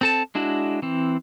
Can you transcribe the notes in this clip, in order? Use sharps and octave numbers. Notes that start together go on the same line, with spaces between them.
C4 A4 A5
G#3 D4 E4 F#4
E3 C4